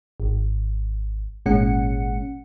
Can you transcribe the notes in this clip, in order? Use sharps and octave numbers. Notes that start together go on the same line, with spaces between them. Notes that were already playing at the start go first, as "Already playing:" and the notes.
G#1
G#1 A#2 G#3 C#4 F#5 C#7